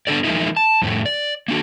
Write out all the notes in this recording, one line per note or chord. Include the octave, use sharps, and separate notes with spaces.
B3 D4 E4 A4 D5
E3 F3 G#3 A#3 D#4 E4
A5
F2 A2 A3
D5
A#3 D4 F#4